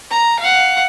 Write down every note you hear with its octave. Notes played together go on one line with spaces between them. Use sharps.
A#5
F5 F#5